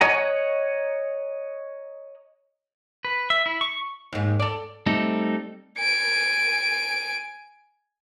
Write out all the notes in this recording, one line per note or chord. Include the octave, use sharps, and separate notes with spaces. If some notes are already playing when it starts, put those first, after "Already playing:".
C#5 D#5 F#5 G#5 A#5
B4
E5
E4
C#6
D#2 G#2
A4 D5
G3 A3 C4 D#4 A4
G#5 D7